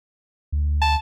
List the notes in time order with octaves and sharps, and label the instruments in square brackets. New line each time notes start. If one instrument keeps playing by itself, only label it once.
[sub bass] D2
[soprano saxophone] A5